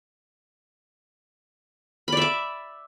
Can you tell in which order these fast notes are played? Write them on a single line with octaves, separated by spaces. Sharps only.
B5 D5 E5 D6